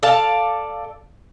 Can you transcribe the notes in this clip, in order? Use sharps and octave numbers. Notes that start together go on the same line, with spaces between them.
A4 D5 F5 A5